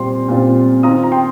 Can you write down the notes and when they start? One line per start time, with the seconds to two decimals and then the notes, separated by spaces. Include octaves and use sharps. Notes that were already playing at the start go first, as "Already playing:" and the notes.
Already playing: A#2 G3 C4 F4 C6
0.28 A#2 G3 C4 F4
0.83 D#3 C4 F4 A#5 D#6
1.03 A#5
1.12 G5 C6